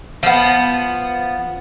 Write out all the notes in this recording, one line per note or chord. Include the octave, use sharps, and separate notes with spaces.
F3 B3